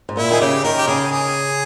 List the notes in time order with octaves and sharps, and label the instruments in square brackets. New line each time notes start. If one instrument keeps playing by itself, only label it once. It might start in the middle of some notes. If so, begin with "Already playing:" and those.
[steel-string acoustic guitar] G#2
[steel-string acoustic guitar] A#2 [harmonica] E4
[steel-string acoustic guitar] D#3 [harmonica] G#4
[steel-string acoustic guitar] C#3 [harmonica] G4
[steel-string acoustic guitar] D#3 [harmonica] A#4
[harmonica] G4
[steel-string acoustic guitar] C#3 [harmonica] G#4
[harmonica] G#4